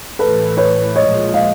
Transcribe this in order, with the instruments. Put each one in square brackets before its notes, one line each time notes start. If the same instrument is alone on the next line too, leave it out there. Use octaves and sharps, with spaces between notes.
[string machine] A2 E3 A3 [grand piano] A4 B4
[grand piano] B4 C#5
[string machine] A#2 F3 G#3 [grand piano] C#5 D#5
[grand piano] D#5 F5